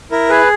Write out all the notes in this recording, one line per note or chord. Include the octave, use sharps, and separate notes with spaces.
E4 A#4
G#4 B4